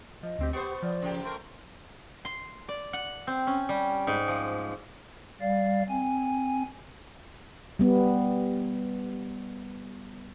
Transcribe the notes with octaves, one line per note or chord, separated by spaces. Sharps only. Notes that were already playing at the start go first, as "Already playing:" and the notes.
F3 D#5
D2 C4 G4
B3 G4 C5 C#6
F3 D5
C#3 A#3 G4
A3 A#4 C6
C6
D5
F#5
C4
C#4
G3
G#2
F3
G3 D5 F5
C4 G#5
G3 B3